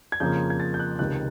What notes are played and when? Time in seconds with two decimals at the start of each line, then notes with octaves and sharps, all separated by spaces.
0.12 G#6
0.20 F2 C#3 F3 A#3 G6
0.50 G#6
0.60 A6
0.74 G6
0.79 F#6
0.99 C#2 C3 D#3 F#6